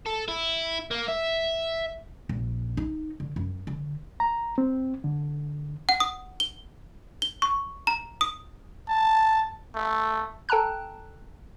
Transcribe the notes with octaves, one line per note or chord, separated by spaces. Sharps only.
A4
E4
A#3
E5
A#1
D#4
D3
F#2
D3
A#5
C4
D3
F#5
D#6
G7
G7
C#6
A#5
D#6
A5
A3
A4 G5 A5 A#5 F#6